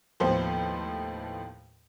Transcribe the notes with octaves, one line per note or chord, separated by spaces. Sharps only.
D#2 A2 F3 B3 C5